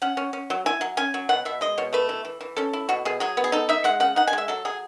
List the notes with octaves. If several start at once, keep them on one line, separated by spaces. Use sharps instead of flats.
C#4 F#5
C#4
C#4
F#3
E4 G#5
F#3
C#4 G#5
F#3
B2 F#5
B2 E5
G#3 D#5
B2 C#5
A3 B4
E3
E3
E3
C#4 A4
E4
B2 F#4
B2 G#4
F#3 G#4
B3
G#4
D#4 A4
D#4 E5
G#3 F#5
C#3 F#5
D#4 F#5
G#5
G#3 E5
F#3 A4
F#3 G#4